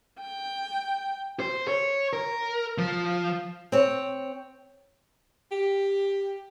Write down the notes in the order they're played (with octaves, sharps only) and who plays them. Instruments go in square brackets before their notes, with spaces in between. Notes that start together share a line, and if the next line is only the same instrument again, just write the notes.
[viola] G5
[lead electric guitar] C5
C#5
A#4
F3
[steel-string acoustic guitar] C4 C#5
[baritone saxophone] G4